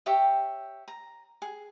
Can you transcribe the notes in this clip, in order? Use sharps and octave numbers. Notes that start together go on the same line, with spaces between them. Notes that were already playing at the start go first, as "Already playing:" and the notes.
G4 C#5 E5 G5
A#5
G#4